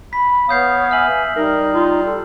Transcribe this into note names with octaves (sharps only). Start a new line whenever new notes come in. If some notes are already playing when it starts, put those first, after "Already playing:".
B5 B6
B3 C#5 F5 D#6 G6 C7
E5 G#5 F6 F#7
G3 D#4 A#4
F4
A4